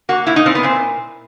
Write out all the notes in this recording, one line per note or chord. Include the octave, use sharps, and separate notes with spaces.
A#3 F#4
A#2 E4
D#4
A#2 C4
B3
A#2 C4